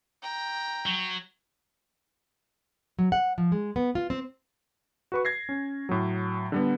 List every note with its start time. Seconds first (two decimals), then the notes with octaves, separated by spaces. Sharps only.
0.23 G5 A#5
0.86 F#3
2.99 F#3
3.12 F#5
3.38 F3
3.52 G#3
3.76 B3
3.95 F4
4.10 C4
5.12 F#4 B4 C#6
5.25 G#6 A#6 C7
5.49 C#4
5.89 A2 F#3
6.52 D3 G3 B3